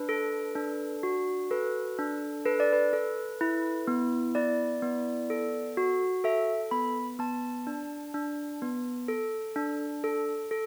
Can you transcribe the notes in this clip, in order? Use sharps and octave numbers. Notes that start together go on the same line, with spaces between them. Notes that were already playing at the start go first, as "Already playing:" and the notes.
Already playing: D4 B4
A4
D4
F#4
A4 B4
D4
A4 B4
D5
B4
A4
E4
B3
E4 D5
B3
A4
F#4
A4 E5
B3 B5
B3 A5
D4
D4
B3
A4
D4
A4
A4